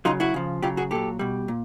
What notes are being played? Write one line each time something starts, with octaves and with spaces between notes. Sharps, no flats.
C#3 F#3 D#4 F4
E4 F#4
C#3 F3
C#3 F#3 F4 G4
F#4 G#4
A#2 F#3 G4 A4
B2 G3
A#2